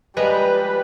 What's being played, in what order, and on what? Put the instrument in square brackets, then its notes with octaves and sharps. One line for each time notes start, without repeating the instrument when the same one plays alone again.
[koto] F3 G#3 A#5 [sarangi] G3 [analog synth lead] B4